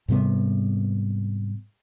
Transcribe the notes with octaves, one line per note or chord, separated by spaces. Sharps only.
G#2 C3 G3 B3